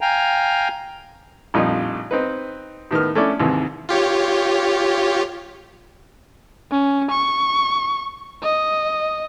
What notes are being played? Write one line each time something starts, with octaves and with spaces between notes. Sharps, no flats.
F5 G5 G#5 A#5
A#1 F2 A2 G3 D#4 F4
C4 D#4 B4
A2 D#3 B3 F6
A3 C#4 D4 E4 D5
D#2 G#2 C3 E3
F4 G4 C#5
C#4
C#6
D#5